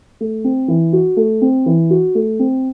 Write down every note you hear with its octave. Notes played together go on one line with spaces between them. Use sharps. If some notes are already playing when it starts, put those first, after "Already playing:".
A3
C4
E3
F#4
A3
C4
E3
F#4
A3
C4